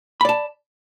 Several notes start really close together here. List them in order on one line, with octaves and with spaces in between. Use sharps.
B5 D5 A5